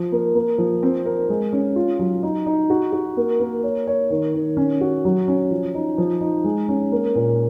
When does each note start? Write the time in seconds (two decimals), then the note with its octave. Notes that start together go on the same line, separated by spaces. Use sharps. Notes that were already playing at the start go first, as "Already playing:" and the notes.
Already playing: F3 C5
0.12 A#3
0.35 A#3
0.58 F3
0.83 C4
1.05 A#4
1.29 G#3
1.53 C#4
1.76 F4
1.99 F#3
2.23 D#4
2.46 D#4
2.70 F#4
2.93 F#4
3.17 A#3
3.40 A#3
3.63 C#5
3.87 C#5
4.10 D#3
4.34 D#3
4.57 C#4
4.81 F#4
5.05 F#3
5.28 C#4
5.51 F3
5.75 D#4
5.98 F3
6.21 D#4
6.44 G#3
6.69 C#4
6.92 A#3
7.15 A#2